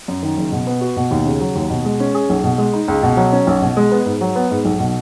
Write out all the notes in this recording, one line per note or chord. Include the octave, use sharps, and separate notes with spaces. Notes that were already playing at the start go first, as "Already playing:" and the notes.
F#2
D#3
F#1
B2
B3
F#4
B2
D#2
C#3
F#3
D#2
B2
G#3
C#4
G#4
B1
B2
G#3
D#4
C#2
B2
F#3
C#4
B1
B2
G#3
B3
G#2
F#3
B3
G#2
B1
B2